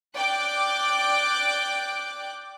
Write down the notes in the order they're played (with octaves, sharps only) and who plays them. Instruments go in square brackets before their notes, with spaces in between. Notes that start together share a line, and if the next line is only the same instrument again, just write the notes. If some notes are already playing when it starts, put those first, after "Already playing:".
[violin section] D5 G5 D6 F#6